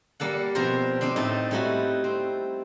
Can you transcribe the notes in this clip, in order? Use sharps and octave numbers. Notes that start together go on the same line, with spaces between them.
G3 A#3 A4 F#5
B2 F3 C4 A#4 C5
C4 D4 D#4 C5
A2 D#4 E5 A5
G3 A3 D#4 E4 F#4
C4